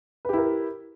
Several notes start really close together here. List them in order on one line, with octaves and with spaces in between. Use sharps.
B4 G4 E4 A#4